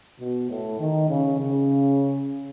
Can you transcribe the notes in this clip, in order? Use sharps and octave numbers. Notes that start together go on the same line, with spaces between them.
B2
A2
D#3
C#3
C#3